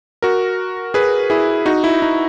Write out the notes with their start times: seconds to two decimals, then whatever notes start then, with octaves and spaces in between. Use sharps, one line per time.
0.22 F#4 A#4
0.94 G#4 B4
1.30 E4 G#4
1.66 D#4 F#4
1.84 E4
2.02 D#4